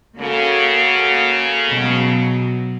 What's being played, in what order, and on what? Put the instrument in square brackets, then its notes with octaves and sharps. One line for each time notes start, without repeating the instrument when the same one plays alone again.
[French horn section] C#3 [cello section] A#3 F#4 A4
[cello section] B2 F#3